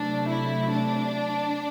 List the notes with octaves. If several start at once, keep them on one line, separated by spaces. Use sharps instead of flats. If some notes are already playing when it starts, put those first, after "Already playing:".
Already playing: C3 F#3 A3 D4
E4
D4